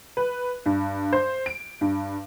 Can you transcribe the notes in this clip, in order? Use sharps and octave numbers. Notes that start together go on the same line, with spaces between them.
B4
G2
C5
D7
G2